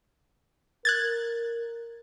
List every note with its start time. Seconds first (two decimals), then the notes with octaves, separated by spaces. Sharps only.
0.85 A#4 F#6 G#6 A6